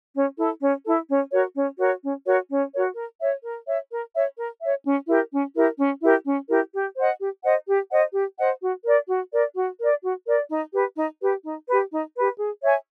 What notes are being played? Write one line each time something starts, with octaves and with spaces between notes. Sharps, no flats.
C#4
E4 A4
C#4
E4 A4
C#4
F#4 A#4 C#5
C#4
F#4 A#4 C#5
C#4
F#4 A#4 C#5
C#4
F#4 A#4 C#5
A#4
C#5 E5
A#4
C#5 E5
A#4
C#5 E5
A#4
C#5 E5
C#4
E4 G4 A#4
C#4
E4 G4 A#4
C#4
E4 G4 A#4
C#4
E4 G4 A#4
G4
C5 D#5 F#5
G4
C5 D#5 F#5
G4
C5 D#5 F#5
G4
C5 D#5 F#5
F#4
A#4 D5
F#4
A#4 D5
F#4
A#4 D5
F#4
A#4 D5
D#4
G4 B4
D#4
G4 B4
D#4
G4 B4
D#4
G4 B4
G#4
C#5 E5 G#5